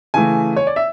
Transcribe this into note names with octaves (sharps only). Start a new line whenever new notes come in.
C#3 E3 A3 G#5
C#5
D5
E5